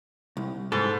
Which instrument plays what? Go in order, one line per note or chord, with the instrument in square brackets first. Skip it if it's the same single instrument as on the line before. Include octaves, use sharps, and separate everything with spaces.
[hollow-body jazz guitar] C2
[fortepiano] G#2 [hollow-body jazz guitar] A4